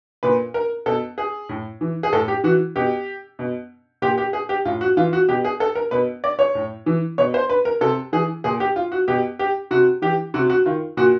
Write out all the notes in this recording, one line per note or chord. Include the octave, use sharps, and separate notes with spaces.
A#2 B4
A#4
B2 A4
G#4
A2
E3
G#4
A2 A4
G4
E3 F#4
B2 G4
B2
A#2 G4
G4
G#4
G4
A2 F4
F#4
E3 F4
F#4
B2 G4
G#4
A4
A#4
B2 B4
D5
C#5
A2
E3
B2 C#5
C5
B4
A#4
C3 A4
E3 G#4
A#2 G#4
G4
F4
F#4
B2 G4
G4
C3 F#4
E3 G4
C3 F#4
F#4
D#3 F4
A#2 F#4